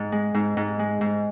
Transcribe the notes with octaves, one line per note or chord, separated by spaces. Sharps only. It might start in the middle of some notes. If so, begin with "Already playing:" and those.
Already playing: G#2
G#3
G#2
G#2
G#3
G#2